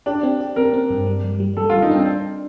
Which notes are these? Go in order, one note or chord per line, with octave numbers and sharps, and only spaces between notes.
D4 G4
C4
G4
C4 A#4
C4
G2
G3
G3
G3
G3 A4
F4
G3
D#4
C4 D4